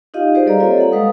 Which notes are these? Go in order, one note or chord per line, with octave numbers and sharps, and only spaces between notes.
D#4 F4 G4 D#5 F5
G4 G#4 B4 C5 D5
G3 A4 D5 F5 A#5
A#3 C4 F4 A4 C#5 D#5
A4 F#5
G#3 B4 F5 D#6